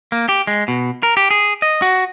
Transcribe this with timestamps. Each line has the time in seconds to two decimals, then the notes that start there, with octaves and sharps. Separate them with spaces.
0.12 A#3
0.29 G4
0.47 G#3
0.68 B2
1.03 A#4
1.17 G4
1.31 G#4
1.62 D#5
1.82 F#4